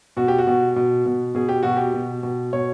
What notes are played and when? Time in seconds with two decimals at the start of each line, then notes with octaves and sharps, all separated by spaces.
0.17 B2 F#4
0.28 G4
0.38 F#4
0.47 B2
0.76 B2
1.06 B2
1.35 B2 G#4
1.49 G4
1.63 B2 F#4
1.77 G4
1.94 B2
2.23 B2
2.53 B2 C#5